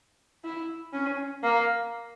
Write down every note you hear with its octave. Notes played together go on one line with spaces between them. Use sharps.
E4
C#4
A#3